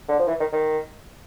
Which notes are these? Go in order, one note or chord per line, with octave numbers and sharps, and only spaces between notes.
D3
F3
E3
D#3
D#3